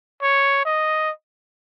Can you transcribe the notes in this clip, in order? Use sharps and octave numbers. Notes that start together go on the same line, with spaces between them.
C#5
D#5